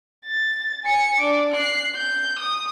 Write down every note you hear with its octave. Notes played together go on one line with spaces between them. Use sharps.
A6
G#5 C#7
D4 D6
F#6 C7
G6
D#6